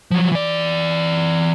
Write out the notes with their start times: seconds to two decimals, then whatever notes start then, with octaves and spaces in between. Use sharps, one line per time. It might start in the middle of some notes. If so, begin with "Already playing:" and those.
0.11 F3 F#3
0.32 E3 D5